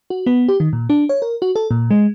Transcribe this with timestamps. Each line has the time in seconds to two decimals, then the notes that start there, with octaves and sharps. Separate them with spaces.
0.10 F#4
0.26 B3
0.48 G4
0.60 D#3
0.73 A#2
0.90 D4
1.09 C#5
1.22 A#4
1.42 F#4
1.56 A4
1.71 A#2
1.91 G#3